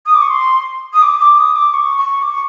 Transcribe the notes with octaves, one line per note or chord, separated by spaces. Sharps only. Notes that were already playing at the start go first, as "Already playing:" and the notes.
D#6
D6
C#6
C6
D#6
D6
D6
D#6
D6
C#6
C#6
D6
C#6